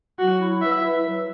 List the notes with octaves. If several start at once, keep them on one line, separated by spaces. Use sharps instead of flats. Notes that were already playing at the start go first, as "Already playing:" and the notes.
F#3 F#4
E4
B4 E5
E4
F#3